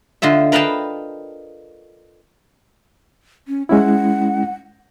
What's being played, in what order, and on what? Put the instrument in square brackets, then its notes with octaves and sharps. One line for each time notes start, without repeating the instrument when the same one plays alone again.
[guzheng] D3 F4 D#5 E5
A#4 B4 D#5 F5 G5 A5
[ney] C#4
[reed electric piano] G#3 C#4 E4 [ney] F#5